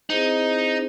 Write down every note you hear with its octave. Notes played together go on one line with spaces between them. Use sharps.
C4 D#4 E4 G#4 C5